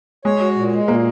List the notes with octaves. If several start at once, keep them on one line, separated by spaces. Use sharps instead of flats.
G#3 C#5
F#4
A#2
G#3
A#2 A#3